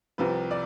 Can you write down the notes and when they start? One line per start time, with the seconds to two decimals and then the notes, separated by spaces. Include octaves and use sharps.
0.18 C2 C3 F3 B4
0.51 D5